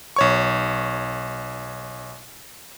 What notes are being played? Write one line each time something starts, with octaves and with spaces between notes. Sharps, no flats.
B1 C#5 C#6